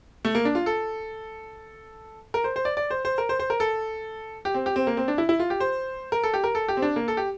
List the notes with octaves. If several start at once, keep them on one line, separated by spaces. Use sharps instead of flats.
A3
A#3
D4
F4
A4
A#4
C5
C5
D5
D5
C5
C5
A#4
C5
C5
A#4
A4
G4
C4
G4
C4
A#3
C4
D4
E4
E4
F4
G4
C5
A#4
A4
G4
A#4
A4
G4
C4
D4
A#3
A4
G4